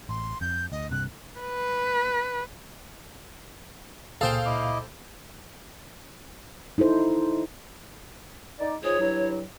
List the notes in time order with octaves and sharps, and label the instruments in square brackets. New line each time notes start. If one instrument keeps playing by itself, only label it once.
[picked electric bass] A1 [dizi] C6
[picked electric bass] F2 [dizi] G6
[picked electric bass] D2 [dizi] D#5
[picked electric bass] C2 G2 C3 [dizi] F#6
[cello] B4
[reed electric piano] C#2 A#2 [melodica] G#4 [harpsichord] A4 C5 G5 [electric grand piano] F5
[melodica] E4 D#5 D6
[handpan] D#4 E4 A4 C5
[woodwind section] D#4 D5
[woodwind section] G#2 F4 G#4 [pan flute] C#5
[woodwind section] G2 F#3 E4